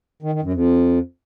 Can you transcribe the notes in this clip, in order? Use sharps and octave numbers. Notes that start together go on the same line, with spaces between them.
D#3
D#3
F#2
F2